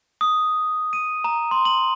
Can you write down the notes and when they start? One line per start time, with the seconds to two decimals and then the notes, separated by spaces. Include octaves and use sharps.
0.21 D#6
0.93 D#7
1.24 A#5
1.51 C6
1.65 F#7